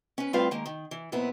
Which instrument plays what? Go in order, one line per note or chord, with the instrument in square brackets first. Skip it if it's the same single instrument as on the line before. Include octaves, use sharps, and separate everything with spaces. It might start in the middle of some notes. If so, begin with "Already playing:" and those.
[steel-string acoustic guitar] C#4 B4
A2 G3 C4 F4 B4 F5
D#3 G#3 A#3
D#3
E3
F2 A#2 B3 E4